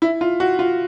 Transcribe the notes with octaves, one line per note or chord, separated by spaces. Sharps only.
E4
F4
F#4
F4